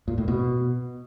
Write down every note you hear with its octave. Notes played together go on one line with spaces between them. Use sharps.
A#2
A2
B2